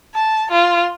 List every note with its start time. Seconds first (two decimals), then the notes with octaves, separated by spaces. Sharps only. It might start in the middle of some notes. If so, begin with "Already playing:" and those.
0.15 A5
0.51 F4